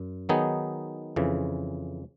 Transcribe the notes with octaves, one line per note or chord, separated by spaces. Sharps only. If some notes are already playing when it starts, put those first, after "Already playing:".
Already playing: F#2
D#3 F#3 B3 D#4 G#4
F2 C#3 E3